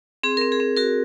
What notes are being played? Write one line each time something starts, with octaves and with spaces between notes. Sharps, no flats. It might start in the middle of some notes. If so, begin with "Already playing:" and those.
C4 G#4
C4 A#4
G#4
C4
F#4 A#4